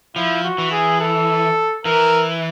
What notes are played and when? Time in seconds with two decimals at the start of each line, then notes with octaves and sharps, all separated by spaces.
0.16 F3 E4
0.44 F#4
0.58 E3
0.72 G#4
1.01 A4
1.85 E3 A#4